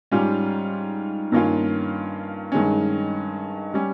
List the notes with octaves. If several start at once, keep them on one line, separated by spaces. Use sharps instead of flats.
G#2 G3 C#4 F4
G2 D#3 A#3 C#4 F4
G2 D#3 G#3 C#4
G3 C#4